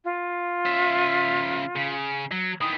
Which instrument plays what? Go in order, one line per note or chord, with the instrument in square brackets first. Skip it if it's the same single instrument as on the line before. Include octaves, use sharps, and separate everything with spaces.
[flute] F4
[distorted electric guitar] C#3 E5
C#3
F#3
[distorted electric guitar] D#3 E3 [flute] D#6